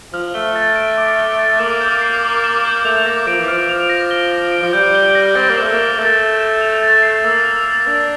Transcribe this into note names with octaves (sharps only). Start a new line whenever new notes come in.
F3 F6
A3 G7
A6
D7
D6
G7
A6
A#3 E7
G6
C7
D6
E7
G6
A3 F7
A#3 A#6
F3 D7
E3
F3 F6
F7
A#6
G7
A#6
D7
F3
G3 G6
G7
A#6
C4 A6
A#3
A3 E7
A#3 G7
A3 A6
A6
E7
F7
A6
C7
A#3 E6
F7
A6
D4 A6